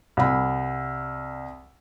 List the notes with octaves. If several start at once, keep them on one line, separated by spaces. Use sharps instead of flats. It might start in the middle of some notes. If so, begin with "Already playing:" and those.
C2 B5